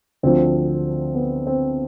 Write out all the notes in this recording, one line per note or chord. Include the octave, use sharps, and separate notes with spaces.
D2 D3 F3 C4
B3
C4